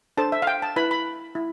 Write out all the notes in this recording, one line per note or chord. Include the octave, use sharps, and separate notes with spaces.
D4 A4 C5 A5
E5
F5
G5
A5
E4 B4 B5
B5
E4